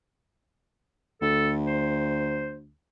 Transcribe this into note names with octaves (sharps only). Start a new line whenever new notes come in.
D2 A4
C5